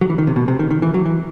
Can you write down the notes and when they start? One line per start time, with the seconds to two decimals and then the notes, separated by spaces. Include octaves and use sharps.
0.01 F#3
0.10 E3
0.18 D#3
0.27 C3
0.36 B2
0.48 C3
0.59 D#3
0.70 D#3
0.82 E3
0.94 F#3
1.06 E3